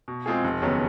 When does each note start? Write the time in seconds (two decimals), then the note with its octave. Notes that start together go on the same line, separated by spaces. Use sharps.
0.08 B2
0.26 G#3 C4 F4 G#4
0.44 F1
0.62 D#2 C#3 F#3 B3